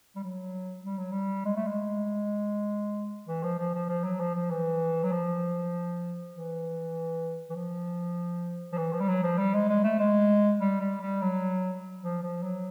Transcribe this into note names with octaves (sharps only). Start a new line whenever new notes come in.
G3
F#3
G3
F#3
G3
G#3
A3
G#3
E3
F3
F3
F3
F3
F#3
F3
F3
E3
F#3
F3
E3
E3
F3
F3
E3
F3
G3
F#3
F3
G3
G#3
G#3
A3
G#3
G3
G3
G3
F#3
F3
F3
F#3